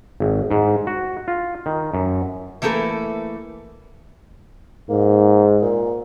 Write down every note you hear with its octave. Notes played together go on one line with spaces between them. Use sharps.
G#1
G#2
F#4
F4
D#3
F#2
E3 A3 A#3 G#4 A4 B4
G#2 A#3
A#2